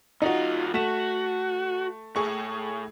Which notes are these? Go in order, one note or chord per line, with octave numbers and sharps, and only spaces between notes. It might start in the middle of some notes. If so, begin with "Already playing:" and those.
D#2 D#4 F4 F#4
A3 F#4 B6 E7
A2 G#4 C#6